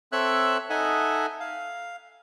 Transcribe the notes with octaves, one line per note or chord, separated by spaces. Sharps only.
C4 A4 C#5 E5 E6 F#6
D#4 A4 D#5 E5 F#5 G#5
F5